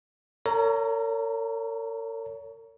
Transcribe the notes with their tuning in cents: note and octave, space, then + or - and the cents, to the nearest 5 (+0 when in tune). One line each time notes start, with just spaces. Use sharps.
A#4 -45 C#5 +25 A#5 +5